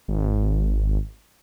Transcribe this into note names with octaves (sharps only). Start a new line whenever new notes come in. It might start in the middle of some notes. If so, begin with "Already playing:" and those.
G#1